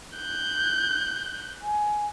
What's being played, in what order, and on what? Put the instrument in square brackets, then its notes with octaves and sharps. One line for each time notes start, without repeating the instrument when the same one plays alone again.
[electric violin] F#6 G6
[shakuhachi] G#5